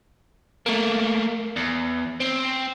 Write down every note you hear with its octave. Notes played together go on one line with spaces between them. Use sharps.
A3 A#3
E2
C4